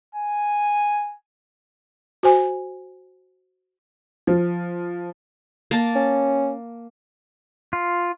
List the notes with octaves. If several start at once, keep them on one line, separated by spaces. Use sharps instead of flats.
G#5
F#4 C5 G#5
F3
A#3 A5
C#4
F4